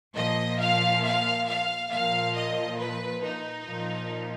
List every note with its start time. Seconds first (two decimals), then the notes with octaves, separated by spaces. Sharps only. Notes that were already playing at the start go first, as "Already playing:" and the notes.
0.16 A#2 F3 D#5
0.59 F5
1.03 F5
1.47 F5
1.91 A#2 F3 F5
2.35 D#5
2.78 B4
3.22 D#4
3.66 A#2 F3